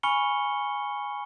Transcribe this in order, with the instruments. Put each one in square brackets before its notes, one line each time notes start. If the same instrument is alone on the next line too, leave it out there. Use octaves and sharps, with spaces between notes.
[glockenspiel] G#5 B5 C#6 F6 C#7 G7